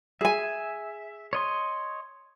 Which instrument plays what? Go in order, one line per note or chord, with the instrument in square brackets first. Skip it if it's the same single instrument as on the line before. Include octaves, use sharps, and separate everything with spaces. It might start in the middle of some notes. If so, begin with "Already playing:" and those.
[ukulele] G#4 G#5 [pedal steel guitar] E5
[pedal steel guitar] C#5 D#5 C6